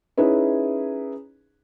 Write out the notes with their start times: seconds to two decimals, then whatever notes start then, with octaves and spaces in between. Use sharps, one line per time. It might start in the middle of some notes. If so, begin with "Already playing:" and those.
0.17 C#4 D#4 E4 G#4 B4